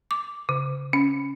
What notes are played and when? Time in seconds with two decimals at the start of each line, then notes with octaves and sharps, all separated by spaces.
0.11 D6
0.49 C#3
0.93 C#4